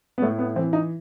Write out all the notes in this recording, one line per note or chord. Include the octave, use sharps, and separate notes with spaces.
B3
A2 A3
B3
E3 C4
D#4